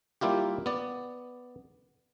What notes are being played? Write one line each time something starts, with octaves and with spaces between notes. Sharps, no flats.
G3 A#3 E4 F4 G4
B3 D5